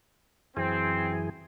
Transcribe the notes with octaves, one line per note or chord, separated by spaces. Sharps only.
F#2 E3 C4 G#4